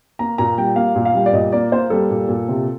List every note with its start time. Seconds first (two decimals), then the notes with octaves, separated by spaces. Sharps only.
0.19 A#3 A#5
0.38 A#2 A#5
0.58 G3 G5
0.76 A#3 F5
0.96 A#2
1.05 F5
1.15 G3
1.26 D5
1.33 A#2 D#5
1.52 A#3 D5
1.72 A#3 C5
1.90 G3 A4
2.11 A#2
2.29 A#2
2.48 C3